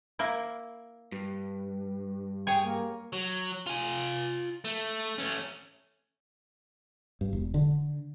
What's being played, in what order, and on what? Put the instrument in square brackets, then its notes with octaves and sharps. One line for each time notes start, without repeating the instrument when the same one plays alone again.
[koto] A#3 E4
[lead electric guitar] G2
[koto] G#4 C#5 [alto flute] G5
[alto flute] A#3
[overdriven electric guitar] F#3
F4 G#5
A3
A3 C#4
[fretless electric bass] G2
E1
D3